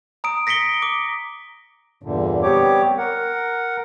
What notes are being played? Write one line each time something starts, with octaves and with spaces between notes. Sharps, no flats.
A#5 D#6 D7
A#6 B6 C#7 D7 G7
D6
E2 G2 A#2 D3
G3 B3 C4 G4 C#5 D6
A#4 F#5